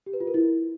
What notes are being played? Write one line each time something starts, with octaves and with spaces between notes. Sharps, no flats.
G4
B4
F4
A#4
E4